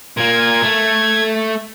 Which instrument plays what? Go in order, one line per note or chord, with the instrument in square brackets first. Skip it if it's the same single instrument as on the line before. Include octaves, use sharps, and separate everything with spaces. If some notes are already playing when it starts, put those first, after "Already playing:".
[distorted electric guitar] A#2 A#3 [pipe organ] G#6
[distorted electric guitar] A3